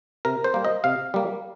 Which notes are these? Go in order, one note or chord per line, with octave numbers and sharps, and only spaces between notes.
C3 A#4
C5
G3 A#3
D#5
C3 F5
G3 A#3